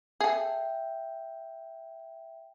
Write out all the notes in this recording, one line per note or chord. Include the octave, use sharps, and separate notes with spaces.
G#4 A4 E5 G5